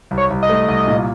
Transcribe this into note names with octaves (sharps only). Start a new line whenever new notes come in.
C2
C#5
C2
D#5
A3
C2
A#2